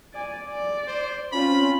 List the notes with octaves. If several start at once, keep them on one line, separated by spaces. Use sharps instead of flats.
D5 G#5
D5
C5
C4 C#4 F4 B5